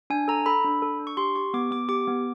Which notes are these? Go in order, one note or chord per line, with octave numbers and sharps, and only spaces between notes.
D4 G#5
A4 A#5
A4 B5
D4
A4
D4
C#6
G4 C6
G4 C#6
B3 D6
B3 D6
G4 D6
B3